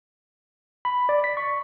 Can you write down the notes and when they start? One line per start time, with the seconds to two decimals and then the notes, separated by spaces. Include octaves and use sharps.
0.85 B5
1.09 D5
1.24 B6
1.37 C#6